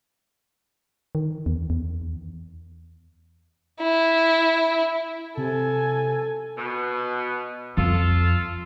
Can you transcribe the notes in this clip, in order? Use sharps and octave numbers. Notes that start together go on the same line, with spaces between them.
D#3
E2
E2
E4
C3 A4 G#5
B2
F2 F4 A4